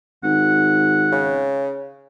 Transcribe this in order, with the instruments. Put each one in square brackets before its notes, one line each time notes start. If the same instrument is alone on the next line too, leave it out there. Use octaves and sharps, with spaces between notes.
[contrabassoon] G#1 [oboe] F#5
[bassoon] C#3